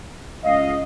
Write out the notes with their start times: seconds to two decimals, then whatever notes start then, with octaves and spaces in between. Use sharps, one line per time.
0.44 C#2 D#5 F5